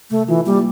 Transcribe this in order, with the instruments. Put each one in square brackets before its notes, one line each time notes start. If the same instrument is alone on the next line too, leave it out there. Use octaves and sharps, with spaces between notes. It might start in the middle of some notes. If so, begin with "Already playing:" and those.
[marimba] C3 [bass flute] A3
[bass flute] E3 [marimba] F4
[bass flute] G3 [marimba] A#3